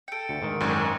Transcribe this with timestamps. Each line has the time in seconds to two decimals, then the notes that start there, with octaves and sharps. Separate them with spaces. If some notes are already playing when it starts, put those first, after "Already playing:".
0.08 A4 G5 C#7 D7
0.29 D2 C#7
0.42 G#2 D#3
0.60 G#1 F#2 D#4 C#5 G#5 F6